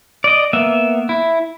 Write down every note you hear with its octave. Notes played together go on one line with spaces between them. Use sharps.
D5 D#5
A#3 B3 E5
E4